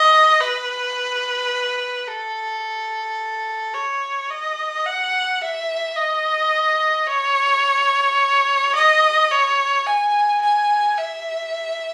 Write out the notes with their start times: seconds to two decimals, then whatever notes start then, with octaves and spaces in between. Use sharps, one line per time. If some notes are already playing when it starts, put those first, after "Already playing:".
Already playing: D#5
0.41 B4
2.08 A4
3.74 C#5
4.30 D#5
4.86 F#5
5.42 E5
5.96 D#5
7.08 C#5
8.75 D#5
9.31 C#5
9.87 G#5
10.41 G#5
10.98 E5